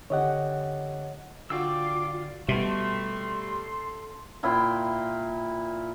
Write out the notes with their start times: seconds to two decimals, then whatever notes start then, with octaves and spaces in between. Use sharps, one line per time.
0.10 D3 G4 C#5 D#5 F#5
1.50 D3 F4 F#4 D5 G5 D6 E6
2.48 B2 G3 A4 E5 C6
4.43 A#2 E4 G5 C6